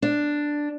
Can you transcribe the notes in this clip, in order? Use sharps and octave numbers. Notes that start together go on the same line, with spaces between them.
D4